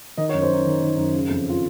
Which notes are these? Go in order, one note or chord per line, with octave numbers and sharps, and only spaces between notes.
D#3 D#5
C#5
F#2
C5
F#2 D#4
D#3
D#3
F#2
C#3
F2
F4